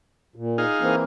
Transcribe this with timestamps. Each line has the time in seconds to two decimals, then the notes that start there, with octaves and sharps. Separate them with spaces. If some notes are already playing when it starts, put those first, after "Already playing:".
0.36 A#2
0.58 D#4 G#4 F5
0.81 E3 A#3 C4